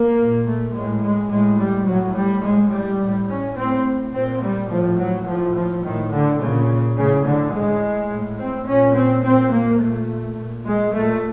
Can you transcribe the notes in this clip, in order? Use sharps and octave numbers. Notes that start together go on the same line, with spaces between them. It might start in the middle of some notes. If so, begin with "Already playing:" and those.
Already playing: A#3
A#2
A3
A2 G#3
G#3
A2 G#3
G3
A2 F#3
G3
A2 G#3
G3
A2
C#4
A2 C4
A#2 C4
G3
A2 F3
F#3
A2 F3
F3
A2 D#3
D3
A#2 C#3
A2 C#3
D3
A2 G#3
A2
C4
A#2 C#4
C4
A#2 C4
A#3
A#2 A3
A#2
G#3
A#2 A3